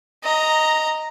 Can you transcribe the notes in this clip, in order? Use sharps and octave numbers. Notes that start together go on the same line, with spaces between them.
D#5 A#5